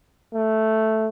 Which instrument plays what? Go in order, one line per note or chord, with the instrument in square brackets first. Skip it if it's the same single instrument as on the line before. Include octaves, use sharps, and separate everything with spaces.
[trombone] A3